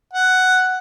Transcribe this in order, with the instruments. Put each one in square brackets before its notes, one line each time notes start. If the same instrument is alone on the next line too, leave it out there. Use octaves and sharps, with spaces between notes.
[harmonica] F#5